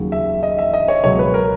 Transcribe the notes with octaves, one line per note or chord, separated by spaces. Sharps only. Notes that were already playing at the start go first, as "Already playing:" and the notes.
Already playing: D#2 C#3 F#3
E5
D#5
E5
D#5
C#5
C#2 B2 F#3 C#5
B4
A#4